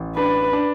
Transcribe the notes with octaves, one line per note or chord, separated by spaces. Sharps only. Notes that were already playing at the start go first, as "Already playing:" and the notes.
Already playing: A1
D4 B4
D4